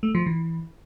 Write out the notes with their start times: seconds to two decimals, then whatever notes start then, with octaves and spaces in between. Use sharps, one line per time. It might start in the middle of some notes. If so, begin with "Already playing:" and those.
0.03 A3
0.15 F3
0.26 E3